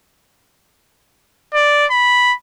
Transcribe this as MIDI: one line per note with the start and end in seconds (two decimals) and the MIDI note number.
1.54 1.86 74
1.91 2.34 83